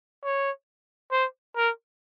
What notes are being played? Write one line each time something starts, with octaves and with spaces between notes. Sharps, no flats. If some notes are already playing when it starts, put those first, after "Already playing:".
C#5
C5
A#4